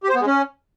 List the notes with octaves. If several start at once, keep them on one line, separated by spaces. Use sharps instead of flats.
G4
C5
B3
G#3
C#4